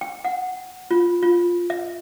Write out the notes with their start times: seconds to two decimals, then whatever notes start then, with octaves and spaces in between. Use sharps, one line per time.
0.01 G5
0.25 F#5
0.91 F4
1.23 F4
1.70 E5